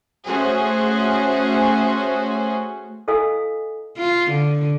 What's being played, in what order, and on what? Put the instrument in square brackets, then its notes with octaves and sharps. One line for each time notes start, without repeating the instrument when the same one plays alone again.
[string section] A3 C#4 F#4 G#4 C5
[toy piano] E4 A4 D#5 F5 G#5 E6
[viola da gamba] F4
D3